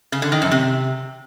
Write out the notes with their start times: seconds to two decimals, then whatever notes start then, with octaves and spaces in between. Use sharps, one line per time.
0.12 C#3
0.22 D3
0.32 D#3
0.42 F#2
0.51 C3